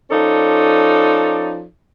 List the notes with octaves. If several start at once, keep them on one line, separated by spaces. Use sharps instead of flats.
F3 C#4 D#4 A4 D5